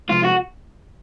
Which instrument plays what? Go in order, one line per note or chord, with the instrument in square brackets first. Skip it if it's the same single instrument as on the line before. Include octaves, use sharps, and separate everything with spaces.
[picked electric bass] C3 F3 G#3 [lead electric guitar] F4
[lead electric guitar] F#4